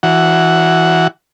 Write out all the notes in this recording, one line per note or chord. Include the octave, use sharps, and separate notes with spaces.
E3 F#4 F#5